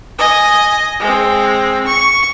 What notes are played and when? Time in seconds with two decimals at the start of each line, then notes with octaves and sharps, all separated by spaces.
0.19 D#5 G#5
1.00 G#3 C4
1.87 C#6